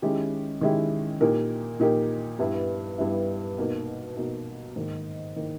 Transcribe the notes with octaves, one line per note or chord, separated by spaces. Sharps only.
D#3 G#3 C#4 E4 G4
D#3 G#3 C#4 E4 G4
A#2 A#3 D#4 G4 A#4
A#2 A#3 D#4 G4 A#4
G2 G3 B3 E4
G2 G3 B3 E4
B2 A#3 D#4
B2 A#3 D#4
G#2 D#3 A#3
D#3 A#3